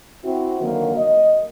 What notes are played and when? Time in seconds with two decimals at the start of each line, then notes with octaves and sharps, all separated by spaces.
0.23 C4 E4 F#4
0.61 D3 D#3 F#3 A#3
0.96 D#5